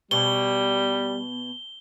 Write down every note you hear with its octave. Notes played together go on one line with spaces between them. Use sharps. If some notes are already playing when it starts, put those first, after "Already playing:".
B2 G3 G7